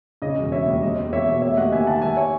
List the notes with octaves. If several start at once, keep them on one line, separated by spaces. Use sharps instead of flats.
C#3 D#5
E1
E1 C#5 E5
D#2
G#3 D#5
E2
E2 C#5 E5
B2
A3 C#5 E5
D#2 D#5 F#5
D#2 E5 G#5
D#3 F#5 A5
G#3 E5 G#5
C#5 E5